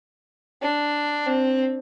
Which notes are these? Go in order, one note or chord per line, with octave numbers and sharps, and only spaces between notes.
D4
C4